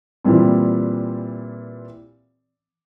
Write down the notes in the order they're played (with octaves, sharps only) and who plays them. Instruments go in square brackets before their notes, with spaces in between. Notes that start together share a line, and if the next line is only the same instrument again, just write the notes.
[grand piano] A#2 E3 G3 C4